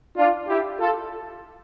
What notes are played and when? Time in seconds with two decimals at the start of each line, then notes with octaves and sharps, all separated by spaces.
0.17 D4 F4
0.48 E4 G4
0.80 F4 A4